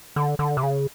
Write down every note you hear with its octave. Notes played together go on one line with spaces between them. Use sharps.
D3
D3
C3
C#3